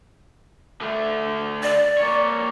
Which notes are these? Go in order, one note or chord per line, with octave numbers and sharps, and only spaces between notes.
D3 A3
D5
A#3 C#5